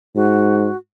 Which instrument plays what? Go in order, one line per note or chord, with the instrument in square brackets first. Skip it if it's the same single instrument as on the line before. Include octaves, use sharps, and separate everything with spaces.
[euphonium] G#2 [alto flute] F#4